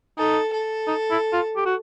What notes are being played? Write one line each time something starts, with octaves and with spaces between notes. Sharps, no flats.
D#4 A4
A4
D#4
E4
F4
G4
F#4